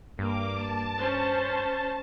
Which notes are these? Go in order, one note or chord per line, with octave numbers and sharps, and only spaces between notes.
G2 A#3 D6
A5
C#4 C5